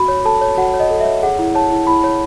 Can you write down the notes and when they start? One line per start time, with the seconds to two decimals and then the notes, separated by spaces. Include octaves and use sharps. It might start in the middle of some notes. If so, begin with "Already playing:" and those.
Already playing: F#4 B5
0.08 C#5
0.25 A4 A5
0.41 C#5
0.57 F#4 F#5
0.73 C#5
0.80 D#5
0.91 A4
1.01 E5
1.06 C#5
1.23 G#4 F#5
1.39 E4
1.55 C#5 A5
1.72 E4
1.87 E4 B5
2.04 C#5